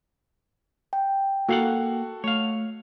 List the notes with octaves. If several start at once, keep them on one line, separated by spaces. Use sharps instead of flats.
G5
A#3 F#4 A4 F5 F#5
A3 C#5 F5